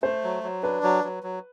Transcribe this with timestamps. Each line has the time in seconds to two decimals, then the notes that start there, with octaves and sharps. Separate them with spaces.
0.02 A3 C5
0.24 F#3
0.43 F#3
0.63 D4 B4
0.83 F#3
1.04 F#3
1.23 F#3